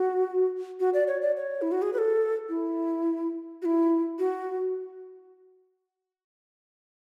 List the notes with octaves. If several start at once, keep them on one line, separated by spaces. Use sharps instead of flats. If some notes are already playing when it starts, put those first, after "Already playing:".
Already playing: F#4
F#4
D5
C#5
D5
C#5
E4
F#4
G#4
B4
A4
E4
F#4
E4
F#4